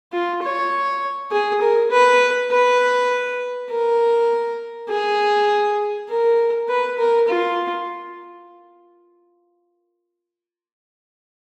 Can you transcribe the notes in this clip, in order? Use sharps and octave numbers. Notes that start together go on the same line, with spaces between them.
F4
C#5
G#4
A#4
B4
B4
A#4
G#4
A#4
B4
A#4
F4